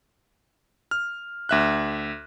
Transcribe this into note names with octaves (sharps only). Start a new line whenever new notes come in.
F6
D2 E5 F#6